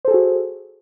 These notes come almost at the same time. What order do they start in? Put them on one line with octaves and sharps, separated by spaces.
C5 A4 G#4 F#4